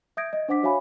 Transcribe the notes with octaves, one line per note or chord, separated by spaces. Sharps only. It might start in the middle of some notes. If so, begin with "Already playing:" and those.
E5 D#6 G6 G#6 A#6 D7
D#5
D4 C5 F#5 D6 B6
F#4 C#5 E5 F5 G#5 B5